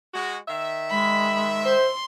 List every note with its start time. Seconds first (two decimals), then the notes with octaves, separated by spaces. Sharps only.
0.14 G#3 F#4
0.48 D#3 E5
0.91 G#3 B5
1.65 C5 C6